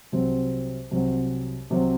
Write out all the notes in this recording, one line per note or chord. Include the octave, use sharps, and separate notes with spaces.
C2 C3 F#3 C4
C2 C3 F#3 C4
C2 C3 F#3 C4